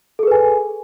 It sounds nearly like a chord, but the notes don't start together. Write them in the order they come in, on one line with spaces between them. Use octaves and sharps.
A4 G#4 B4 G#5